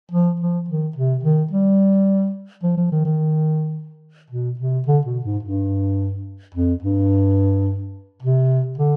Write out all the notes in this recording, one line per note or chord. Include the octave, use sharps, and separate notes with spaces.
F3
F3
D#3
C3
D#3
G3
F3
F3
D#3
D#3
B2
C3
D3
B2
G#2
G2
F2
G2
C3
D3